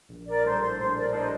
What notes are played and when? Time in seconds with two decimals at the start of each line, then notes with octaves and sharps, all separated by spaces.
0.09 A#1
0.27 A#4 D5
0.44 A2 G3 D4 A4 C5
0.61 C5
0.78 A#1 C5
0.96 A#4 D5
1.13 A2 G3 D4 A4 C5 D#5